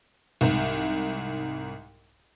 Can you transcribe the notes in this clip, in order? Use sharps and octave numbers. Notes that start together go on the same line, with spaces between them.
C2 G#2